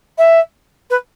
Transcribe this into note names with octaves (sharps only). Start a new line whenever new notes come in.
E5
B4